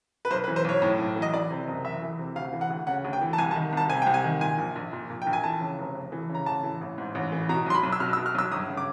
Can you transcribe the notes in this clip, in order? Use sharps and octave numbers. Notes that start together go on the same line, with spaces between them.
B4
B1 C5
B4
E3
C5
B1 C#5
A2
B1
E3
D#5
E3 D5
C3
F#1
E2 E5
E3
C3
D2 F5
E3
F#5
D2
C#3 F#5
D2
G5
E3
A5
C2 G#5
A5
D#3
C2 A5
C3 G#5
C2 G5
G#5
D#3
A#2 G#5
A#1
A#1
A#2
A#2
A#1 G5
G#5
E3 A5
C#3
F1
F2
E3
C#3
A#5
A1 A5
E3
A1
G#2
A1
E3
B2 A#5
B1 C6
B5
B1
E6
B2 F6
E6
B2
F6
B1 E6
G1 D#6
C#3
D6